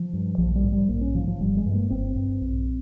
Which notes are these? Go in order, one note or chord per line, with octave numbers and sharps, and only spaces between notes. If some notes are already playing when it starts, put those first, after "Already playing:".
Already playing: F3
G2
A#1 F3
G3
G#2
G3
A#1 A#3
C#4
G#2 F3
F3
G1 G3
G#3
G2
A#3
G1 C4
G2
A#1